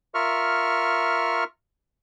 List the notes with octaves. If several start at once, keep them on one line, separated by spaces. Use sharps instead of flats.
F4 A#4 E5 C#6 F6